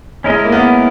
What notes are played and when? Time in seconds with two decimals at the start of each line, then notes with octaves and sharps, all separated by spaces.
0.24 G#3 C#4 E4 A#4 D#5
0.45 A#3
0.52 B3